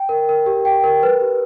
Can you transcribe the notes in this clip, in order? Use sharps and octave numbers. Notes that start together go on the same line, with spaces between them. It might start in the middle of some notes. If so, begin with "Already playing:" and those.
Already playing: G5
A#4
A#4
G4
G5
A#4
B4
G4